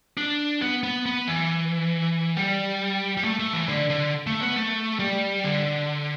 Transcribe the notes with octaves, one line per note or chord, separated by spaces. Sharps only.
D4
B3
B3
B3
E3
G3
G3
A3
A3
E3
D3
D3
A3
B3
A3
G3
D3